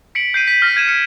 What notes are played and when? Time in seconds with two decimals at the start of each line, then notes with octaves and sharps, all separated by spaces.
0.15 B6 C#7 D7 F#7
0.34 G6 C7 D#7
0.47 B6
0.62 F6 A#6
0.75 G6 G#6 D#7 E7
0.87 G#6 B6 C#7 D#7